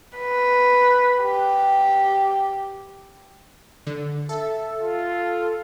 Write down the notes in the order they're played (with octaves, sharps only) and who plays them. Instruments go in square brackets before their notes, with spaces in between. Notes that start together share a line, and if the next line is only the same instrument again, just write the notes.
[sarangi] B4
G4
[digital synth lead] D3
[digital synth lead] A4 [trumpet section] E5
[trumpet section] F4